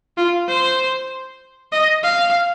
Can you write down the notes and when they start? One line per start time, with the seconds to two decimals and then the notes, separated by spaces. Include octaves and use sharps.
0.17 F4
0.48 C5
1.72 D#5
2.03 F5